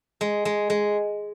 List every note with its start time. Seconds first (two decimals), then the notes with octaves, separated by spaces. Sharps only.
0.21 G#3
0.45 G#3
0.70 G#3